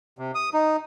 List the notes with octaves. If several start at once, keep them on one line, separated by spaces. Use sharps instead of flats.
C3
D#6
D#4